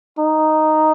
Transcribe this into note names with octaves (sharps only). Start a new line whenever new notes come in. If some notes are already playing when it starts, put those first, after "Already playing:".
D#4